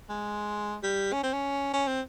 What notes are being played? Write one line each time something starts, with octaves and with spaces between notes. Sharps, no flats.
G#3
G3
C#4
C4
C#4
C#4
C4